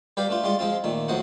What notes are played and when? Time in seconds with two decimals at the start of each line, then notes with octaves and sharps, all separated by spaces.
0.17 G3 G4 B4 F5 G5
0.29 A3 D4 F4
0.44 G3 G#3 F4
0.59 F3 G#3 C4 F4
0.84 A#2 D#3 A3
1.08 F2 A2 F#3 C5 D#5 F#5